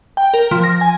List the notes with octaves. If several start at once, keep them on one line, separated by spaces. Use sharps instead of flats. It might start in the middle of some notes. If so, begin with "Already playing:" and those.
G5
A#4
F3
A#6
G#5